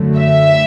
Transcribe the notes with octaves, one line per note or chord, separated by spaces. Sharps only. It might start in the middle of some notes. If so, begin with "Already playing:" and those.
Already playing: F#2 D3 F#3 A3
E5